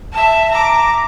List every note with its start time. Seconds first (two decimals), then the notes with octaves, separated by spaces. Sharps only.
0.12 E5 A5
0.51 A#5 D6